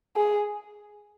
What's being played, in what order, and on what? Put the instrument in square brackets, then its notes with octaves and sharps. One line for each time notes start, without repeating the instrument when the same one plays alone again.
[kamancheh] G#4